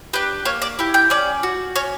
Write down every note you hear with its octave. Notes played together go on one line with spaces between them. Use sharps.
D4 G4 B4
A#3 C#5
D5
E4 G4
G5
C#4 D5
F#4
C#4 C#5